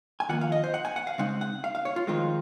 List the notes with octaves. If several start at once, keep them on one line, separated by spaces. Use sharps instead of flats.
G#5
F2 D#3 A#3 F4 F#5
F5
D#5
C5
F#5
G#5
F#5
F5
C#3 G#3 C4 D#4 F#5
F#5
F5
F5
C#5
F4
F2 D#3 G#3 C4 F4